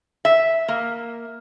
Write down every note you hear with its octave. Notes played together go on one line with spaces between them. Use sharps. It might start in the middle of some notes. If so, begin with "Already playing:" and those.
E5
A#3